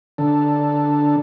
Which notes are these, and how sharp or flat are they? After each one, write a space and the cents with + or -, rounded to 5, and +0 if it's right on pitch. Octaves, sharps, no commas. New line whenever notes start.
D3 +0 D4 -5 A4 +0